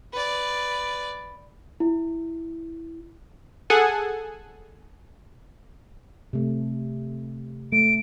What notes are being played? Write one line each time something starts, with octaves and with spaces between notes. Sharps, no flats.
B4 D5
E4
G#4 A4 F#5 G#5
C3 A3
A3 D7